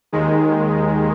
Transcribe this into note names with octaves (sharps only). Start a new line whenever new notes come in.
D#2 D#3 G#3